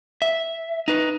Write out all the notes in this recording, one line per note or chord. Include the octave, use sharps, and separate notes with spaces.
E5
D#4 B4